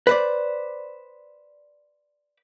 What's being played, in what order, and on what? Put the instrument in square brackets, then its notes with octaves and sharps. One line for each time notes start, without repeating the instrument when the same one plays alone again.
[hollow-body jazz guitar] B4 C5 D5